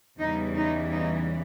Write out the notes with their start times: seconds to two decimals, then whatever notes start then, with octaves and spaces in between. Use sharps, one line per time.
0.19 E2 C#3 E3 G3 D#4
0.55 D#4
0.91 D#4